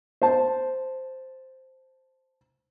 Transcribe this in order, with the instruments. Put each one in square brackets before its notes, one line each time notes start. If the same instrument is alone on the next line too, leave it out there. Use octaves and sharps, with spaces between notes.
[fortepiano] C5 A5